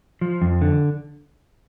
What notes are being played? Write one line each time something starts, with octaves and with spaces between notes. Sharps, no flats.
F3
F2
D3